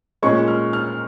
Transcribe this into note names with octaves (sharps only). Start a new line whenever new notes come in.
A#2 G#3 C#4 C#6
F6
F6